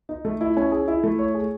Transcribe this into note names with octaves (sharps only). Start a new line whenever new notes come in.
D#4
A3
E4
C#4
G#4
E4
A3
C#5
G#4